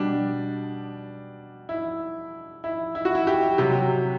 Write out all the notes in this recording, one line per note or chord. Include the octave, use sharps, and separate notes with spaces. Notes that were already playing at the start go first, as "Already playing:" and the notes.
Already playing: B2 G3 D4
E4
E4
E4
F#4
E4
G4
C3 F#3 G4